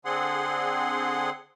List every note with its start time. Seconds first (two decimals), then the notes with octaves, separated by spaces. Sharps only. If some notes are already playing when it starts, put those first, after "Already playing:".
0.05 D3 C4 G#4 F#5 C6